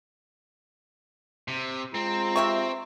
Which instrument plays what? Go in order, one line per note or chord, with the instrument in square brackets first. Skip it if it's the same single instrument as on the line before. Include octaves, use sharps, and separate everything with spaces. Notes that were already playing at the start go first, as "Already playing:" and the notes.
[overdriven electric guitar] C3
[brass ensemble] G#3 F4 A#5 [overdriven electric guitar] C4
[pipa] C3 E5 C#6